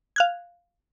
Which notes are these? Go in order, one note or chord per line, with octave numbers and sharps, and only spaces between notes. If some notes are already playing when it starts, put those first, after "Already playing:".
F5 F#6 G#6